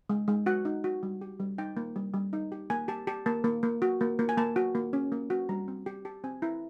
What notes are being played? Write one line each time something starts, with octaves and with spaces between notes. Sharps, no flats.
G#3
G#3
F#4 F#5
D#4
F#4
G3
G4
G3
D#4 G5
A#3
G3
G3
D#4
G4
A#3 G#5
G4 A5
G4 A5
A#3 A5
A#3
A#3
F#4
A#3
A#3
G#5
A#3 A5
F#4
A#3
C#4
A#3
F#4
G3 A#5
C4
G4
G4 A5
C4 G#5
E4 A#5